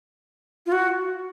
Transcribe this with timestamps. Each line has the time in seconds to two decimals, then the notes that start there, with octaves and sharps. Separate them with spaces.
0.66 F4
0.72 F#4